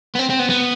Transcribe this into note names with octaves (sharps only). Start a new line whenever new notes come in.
B3
C4
C4
B3
B3